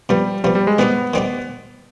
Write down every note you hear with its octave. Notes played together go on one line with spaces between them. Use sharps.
C3 F3 G3 B3
C3 F3 G3 B3
G3
G#3
D#3 G3 B3 C4 D#4 G4
D#3 G3 C4 D#4 G4